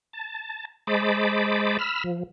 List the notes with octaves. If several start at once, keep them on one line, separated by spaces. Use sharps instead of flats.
A5
G#3 C5 D#5 A5 B5 D6
B5 E6 F6
F3